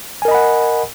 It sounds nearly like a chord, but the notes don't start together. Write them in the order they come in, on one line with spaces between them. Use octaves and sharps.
G#5 A#4 D#5 B5 F#5